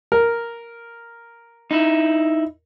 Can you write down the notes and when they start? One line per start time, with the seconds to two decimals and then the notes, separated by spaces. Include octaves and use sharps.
0.12 A#4
1.71 D#4 E4